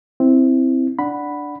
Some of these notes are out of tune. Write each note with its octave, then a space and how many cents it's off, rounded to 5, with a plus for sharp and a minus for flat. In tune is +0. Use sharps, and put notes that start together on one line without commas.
C4 +0 E4 +0
D4 +0 F#5 +0 B5 +0